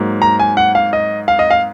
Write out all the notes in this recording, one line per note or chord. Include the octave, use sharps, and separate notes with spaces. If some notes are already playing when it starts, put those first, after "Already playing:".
Already playing: G#2 F#3 A#3
A#5
G#5
F#5
F5
D#5
F5
D#5
F5